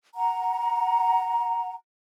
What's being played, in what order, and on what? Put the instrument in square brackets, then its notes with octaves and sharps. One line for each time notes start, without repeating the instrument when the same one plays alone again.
[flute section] F#5 A#5